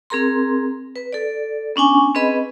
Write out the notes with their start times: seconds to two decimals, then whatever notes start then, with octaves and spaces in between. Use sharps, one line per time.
0.10 C4 G#4 A#4 A#5 C6
0.96 B4
1.13 A4 D5
1.76 B3 C#4 D4 G#5 C#6
2.15 C4 G#4 B4 D#5 B5